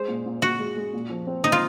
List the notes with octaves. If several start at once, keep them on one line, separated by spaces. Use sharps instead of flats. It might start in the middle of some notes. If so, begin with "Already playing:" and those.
Already playing: G#3 C5
A#2
A#2
A#2 F#4
G#3
G#3
A#2
F3
C4
A#2 D#4
F4